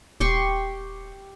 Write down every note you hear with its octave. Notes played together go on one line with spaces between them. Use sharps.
D#1 G4 C6 C#6